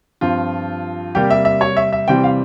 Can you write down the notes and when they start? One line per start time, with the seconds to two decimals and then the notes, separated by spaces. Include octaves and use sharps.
0.21 G2 F3 C4 F4
1.15 C3 G3 A#3 G4
1.30 E5
1.45 E5
1.61 C#5
1.77 E5
1.93 E5
2.08 C3 E3 G3 C4 G5
2.24 F5